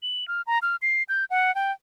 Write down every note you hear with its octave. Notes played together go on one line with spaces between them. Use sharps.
F#7
F6
A#5
F6
C7
G6
F#5
G5